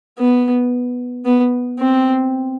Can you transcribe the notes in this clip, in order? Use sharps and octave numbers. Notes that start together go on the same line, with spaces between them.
B3
B3
C4